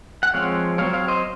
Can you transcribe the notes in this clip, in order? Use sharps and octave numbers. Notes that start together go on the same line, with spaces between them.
F#5
F3 G#3 C4 C#5 F5
F#3 C4 C#5 F5
C#5 F5
C5 D#5